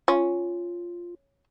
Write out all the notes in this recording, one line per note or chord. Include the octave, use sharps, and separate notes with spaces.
C#4 F4